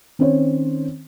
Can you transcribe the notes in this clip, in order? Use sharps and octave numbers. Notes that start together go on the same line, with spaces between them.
D#3 C4 C#4 C5 C#5